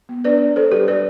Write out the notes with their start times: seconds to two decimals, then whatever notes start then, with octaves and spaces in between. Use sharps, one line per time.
0.09 B3
0.24 D4 B4 D5
0.41 D4
0.56 D4 A4 C5
0.71 G3 G4 B4
0.88 G3 B4 D5